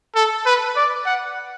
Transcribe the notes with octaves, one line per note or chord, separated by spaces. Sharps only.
A4
B4
D5
F#5